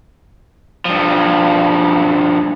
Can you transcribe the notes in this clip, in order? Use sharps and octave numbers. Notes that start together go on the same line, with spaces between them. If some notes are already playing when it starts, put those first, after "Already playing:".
G2 F3